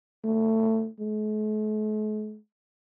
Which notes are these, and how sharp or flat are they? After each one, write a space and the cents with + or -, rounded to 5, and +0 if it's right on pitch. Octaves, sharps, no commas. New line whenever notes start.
A3 +20
A3 -45